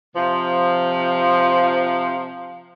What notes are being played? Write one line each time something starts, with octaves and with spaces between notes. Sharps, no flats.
C3 F3